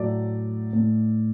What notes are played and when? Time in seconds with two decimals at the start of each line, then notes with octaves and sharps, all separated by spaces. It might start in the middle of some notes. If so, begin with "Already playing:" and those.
Already playing: A2 F#3 A3 D5
0.73 A2 A3